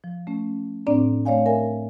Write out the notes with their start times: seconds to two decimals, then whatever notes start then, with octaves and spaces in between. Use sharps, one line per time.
0.04 F3
0.27 A3 C#4
0.87 A2 C4 D4 D5 A#5
1.25 A3 C#5 D5 F5 G#5
1.46 A#4 D5 E5 G#5